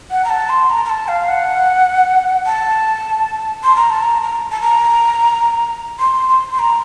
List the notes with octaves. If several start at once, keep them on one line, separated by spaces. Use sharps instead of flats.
F#5
A#5
A5
C6
A#5
A#5
A5
F5
F#5
A5
C6
A#5
A5
A#5
A#5
A5
A#5
C6
C6
C6
A#5